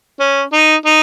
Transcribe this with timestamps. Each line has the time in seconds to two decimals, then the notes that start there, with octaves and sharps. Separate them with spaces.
0.20 C#4
0.53 D#4
0.86 D#4